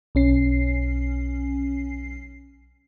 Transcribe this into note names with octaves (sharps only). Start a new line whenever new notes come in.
B1 C#4 C7